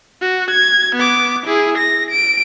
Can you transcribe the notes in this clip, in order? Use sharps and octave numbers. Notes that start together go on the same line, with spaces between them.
F#4
G#6
B3 D6
E4 G#4
A#6
D7